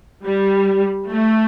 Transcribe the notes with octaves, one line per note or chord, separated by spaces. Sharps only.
G3
A3